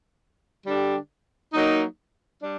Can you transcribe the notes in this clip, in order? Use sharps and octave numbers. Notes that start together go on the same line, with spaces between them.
D3 G3 D4 G4
F#3 A#3 D#4
G3 D4